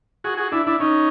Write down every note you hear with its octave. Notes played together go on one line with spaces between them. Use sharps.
F#4 G#4
F#4 G#4
D4 E4
D4 E4
C#4 D#4